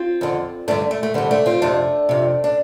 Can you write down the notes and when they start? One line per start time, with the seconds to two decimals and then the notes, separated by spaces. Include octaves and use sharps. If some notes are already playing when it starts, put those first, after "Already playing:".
Already playing: C4 F4
0.21 F2 D3
0.68 G2 D3 A3 D4
0.91 A3
1.03 A3
1.14 G2 D3 G3 C4
1.31 A3 D4
1.46 C4 F4
1.62 F2 C3 A3 D4
2.09 F2 C3
2.44 D4